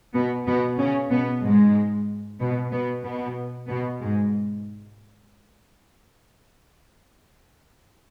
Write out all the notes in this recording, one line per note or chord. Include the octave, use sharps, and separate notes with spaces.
B2 B3
B2 B3
C#3 C#4
B2 B3
G#2 G#3
B2 B3
B2 B3
B2 B3
B2 B3
G#2 G#3